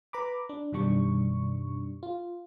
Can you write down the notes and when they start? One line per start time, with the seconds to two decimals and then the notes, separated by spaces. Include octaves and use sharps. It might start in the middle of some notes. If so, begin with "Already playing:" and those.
0.13 B4 A#5 B5 D6
0.49 D4
0.72 F#2 B2 D#3 G3 D4 C#6
2.03 F4